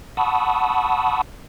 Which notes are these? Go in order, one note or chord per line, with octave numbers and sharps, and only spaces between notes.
F#5 A5 B5 C#6 D#6 E6